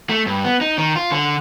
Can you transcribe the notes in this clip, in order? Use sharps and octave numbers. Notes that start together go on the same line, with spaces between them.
A3
G2
B3
D#4
D#3
F4
D3